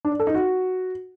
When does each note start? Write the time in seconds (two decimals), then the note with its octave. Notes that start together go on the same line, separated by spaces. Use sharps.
0.05 D4
0.12 D5
0.20 A4
0.27 D#4
0.34 F#4